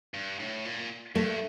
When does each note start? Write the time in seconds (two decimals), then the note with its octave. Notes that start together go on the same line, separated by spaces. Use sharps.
0.14 G2
0.39 A2
0.65 A#2
1.15 G2 A3